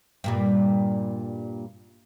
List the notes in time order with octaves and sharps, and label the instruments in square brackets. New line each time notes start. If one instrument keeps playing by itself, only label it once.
[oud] G2 A#2 G3